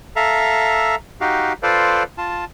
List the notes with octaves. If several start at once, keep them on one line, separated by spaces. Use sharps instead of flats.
A4 E5 F5 A#5
D#4 F#4 G4 F5
F4 A4 B4 C5 D5 F5
F4 A5